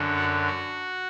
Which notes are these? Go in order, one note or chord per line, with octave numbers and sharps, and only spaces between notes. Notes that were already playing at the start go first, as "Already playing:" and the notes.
Already playing: F#2 D3 F#3
F#4
F#4